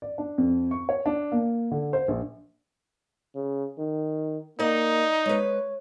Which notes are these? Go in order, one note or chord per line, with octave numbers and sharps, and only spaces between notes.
D5
D4
F2
C#6
C#5
D4
A#3
D3
C5
A#1
C#3
D#3
A#3 D#4 D5 D#5 F#5
G#3 B4 C#5